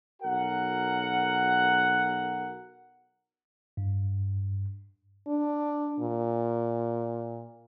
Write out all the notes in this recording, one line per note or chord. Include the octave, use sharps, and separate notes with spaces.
B1 F#4 A#4 F#5
G2
D4
A#2